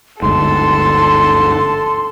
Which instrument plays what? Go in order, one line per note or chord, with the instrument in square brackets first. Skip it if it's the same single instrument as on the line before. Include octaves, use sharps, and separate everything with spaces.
[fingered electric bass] G1 D2 G#2 [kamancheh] A4 A5 [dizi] C6